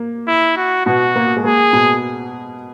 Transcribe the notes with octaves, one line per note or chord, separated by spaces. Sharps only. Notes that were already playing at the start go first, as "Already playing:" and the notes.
Already playing: A#3
E4
F#4
B2 B3 F#4
A#3
G#3
A#3 G#4
B2 B3